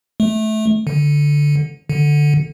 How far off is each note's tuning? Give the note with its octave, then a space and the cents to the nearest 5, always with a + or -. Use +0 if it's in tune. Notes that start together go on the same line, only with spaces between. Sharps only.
A3 -20
D3 -5
D3 +5